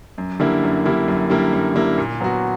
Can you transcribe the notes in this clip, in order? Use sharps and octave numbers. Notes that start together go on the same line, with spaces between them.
F#2
D3 G3 A#3 E4
F#2
D3 G3 A#3 E4
F#2
D3 G3 A#3 E4
F#2
D3 G3 A#3 E4
A#2
F#3 B3 F#4